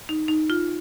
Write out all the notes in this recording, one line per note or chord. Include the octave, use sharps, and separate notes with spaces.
D#4
D#4
F4